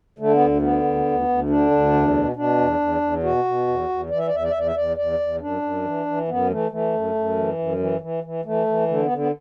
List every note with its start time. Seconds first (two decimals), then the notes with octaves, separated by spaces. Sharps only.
0.19 D3 A3
0.33 B3
0.40 D2
0.62 D3 B3
0.84 D2
1.05 D2
1.28 D2
1.49 D3 D4
1.71 D2
1.93 E2
2.14 B2
2.36 B2 D4
2.58 E2
2.79 E2
3.01 E2
3.23 B2 F#4
3.45 B2
3.67 E2
3.89 E2
4.10 E3 D5
4.19 E5
4.27 D5
4.31 E2 E5
4.44 D5
4.51 E2 E5
4.59 D5
4.67 E5
4.76 E2 D5
4.97 E2 D5
5.20 E2
5.40 F#2 D4
5.62 F#2
5.84 E3
6.06 E3
6.28 F#2 B3
6.49 E3 A3
6.70 E3 A3
6.93 F#2
7.15 F#2
7.36 E3
7.58 F#2
7.79 E3
8.01 E3
8.24 E3
8.45 E3 A3
8.67 E3
8.88 D3 A3
9.03 B3
9.11 D3
9.18 B3